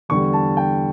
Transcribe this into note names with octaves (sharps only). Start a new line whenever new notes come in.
E2 D3 G3 C#6
A5
G5